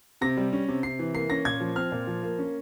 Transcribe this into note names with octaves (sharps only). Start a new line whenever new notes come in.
C3 A#6
G3
C#4
C3
C3 C7
E3
A#3 C7
C#4 A#6
A#2 G#6
F3
C4 F6
A#2
F3
A#3
C#4